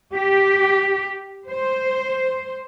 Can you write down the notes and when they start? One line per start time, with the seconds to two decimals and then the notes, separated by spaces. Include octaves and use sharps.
0.14 G4
1.47 C5